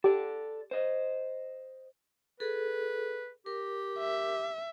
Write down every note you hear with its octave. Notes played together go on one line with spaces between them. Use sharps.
G4 A4 D5
C5 D#5
G#4 A4 B4
G4 A#4
E5